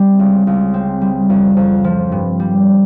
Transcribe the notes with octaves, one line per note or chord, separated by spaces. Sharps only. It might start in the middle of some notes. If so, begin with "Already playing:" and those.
Already playing: G3 C4
C#2
C#2
C4
G3
F2
F2
F3
G2
G3